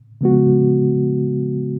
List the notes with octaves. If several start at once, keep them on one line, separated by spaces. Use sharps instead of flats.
C#3 F3 G#3 B3 F#4